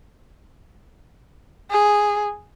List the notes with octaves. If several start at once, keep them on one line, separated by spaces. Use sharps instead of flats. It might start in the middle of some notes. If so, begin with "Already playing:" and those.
G#4